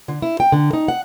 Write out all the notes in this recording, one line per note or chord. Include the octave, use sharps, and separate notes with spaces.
D3
E4
G5
D3
D#4
F#5